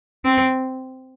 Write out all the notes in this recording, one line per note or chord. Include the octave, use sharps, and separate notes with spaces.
C4